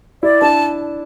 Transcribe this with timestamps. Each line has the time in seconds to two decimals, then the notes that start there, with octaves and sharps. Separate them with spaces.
0.23 E4 D5
0.41 D4 A5